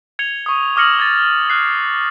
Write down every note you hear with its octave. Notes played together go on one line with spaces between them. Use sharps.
G#6 C#7 F7 G7
C#6 D#6
D6 D#6 F6 A#6 C#7 F#7
G#6 A6
F6 F#6 C7